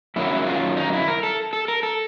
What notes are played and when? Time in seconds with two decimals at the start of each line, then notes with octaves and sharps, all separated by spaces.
0.16 F#2 D#3 F#3 E4
0.47 F4
0.77 D#4
0.93 E4
1.08 A#4
1.23 A4
1.53 A4
1.68 A#4
1.83 A4